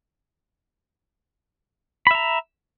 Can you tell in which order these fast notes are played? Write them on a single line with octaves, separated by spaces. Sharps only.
B5 E5 A#5